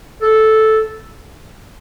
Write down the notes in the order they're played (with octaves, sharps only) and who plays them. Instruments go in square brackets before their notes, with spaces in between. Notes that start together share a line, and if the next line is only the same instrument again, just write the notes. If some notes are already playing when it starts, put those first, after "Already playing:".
[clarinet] A4